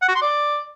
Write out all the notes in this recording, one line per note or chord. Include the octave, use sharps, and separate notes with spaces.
F#5
F#4
C6
D5